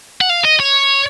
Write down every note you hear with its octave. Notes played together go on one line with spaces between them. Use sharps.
F#5
F5
D#5
C#5